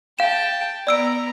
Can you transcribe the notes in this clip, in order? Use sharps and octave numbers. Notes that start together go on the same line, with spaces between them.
F5 G5 A5 E7
B3 D5 A#5 E6 D7